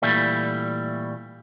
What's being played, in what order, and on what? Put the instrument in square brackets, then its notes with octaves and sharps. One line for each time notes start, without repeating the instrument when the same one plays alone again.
[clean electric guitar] A#2 E3 G3 A3